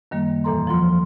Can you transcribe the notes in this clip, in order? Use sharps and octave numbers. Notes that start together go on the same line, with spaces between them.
F#2 D#3 G3 A#3
E2 A#2 E3 A4 A#5 C6
F3 F#3 F4 C6